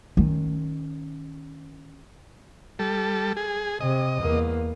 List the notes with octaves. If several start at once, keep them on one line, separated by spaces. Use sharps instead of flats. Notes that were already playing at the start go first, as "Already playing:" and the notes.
D#3 C#4
G3 A4
G#4
C3 D#5
E2 A#3